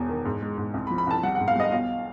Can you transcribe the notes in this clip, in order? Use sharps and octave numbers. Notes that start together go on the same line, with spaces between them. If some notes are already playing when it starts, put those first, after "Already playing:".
Already playing: E1 E2
D#3
G#2
G#3
G#2
C2
B5
F3
B5
C2 A5
G3 F#5
G#2 F#5
F5
G3 D#5
B1 F5